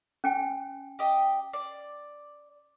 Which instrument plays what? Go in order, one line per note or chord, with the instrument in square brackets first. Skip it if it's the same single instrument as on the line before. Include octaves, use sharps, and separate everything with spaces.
[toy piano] C#4 G5 G#5
[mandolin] G4 D#5
D5